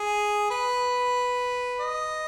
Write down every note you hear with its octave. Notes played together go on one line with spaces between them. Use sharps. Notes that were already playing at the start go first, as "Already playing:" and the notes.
Already playing: G#4
B4
D#5